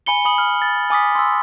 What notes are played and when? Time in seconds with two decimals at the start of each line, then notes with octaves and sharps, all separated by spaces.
0.06 G#5 B5 C#7 G7
0.25 B5 D#6 F#7
0.38 F6
0.62 A6
0.90 G#5 D6 D#6 B6
1.15 C6 E6